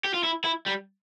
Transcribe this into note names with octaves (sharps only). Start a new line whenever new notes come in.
G4
F4
E4
E4
G3